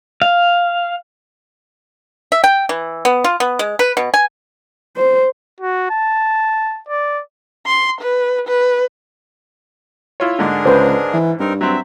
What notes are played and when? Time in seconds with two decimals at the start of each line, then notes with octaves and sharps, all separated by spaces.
0.22 F5
2.32 E5
2.44 G5
2.69 E3
3.05 B3
3.24 F4
3.40 B3
3.59 G#3
3.79 B4
3.97 B2
4.14 G#5
4.96 C5
5.60 F#4
5.91 A5
6.88 D5
7.66 C6
8.01 B4
8.47 B4
10.20 E4 F4 C#5
10.39 G#2 D3 D4 G#4 A#4
10.66 C#2 B4 C5
11.13 E3
11.40 G2 C4 D#4 A#4
11.61 F#3 C4 E5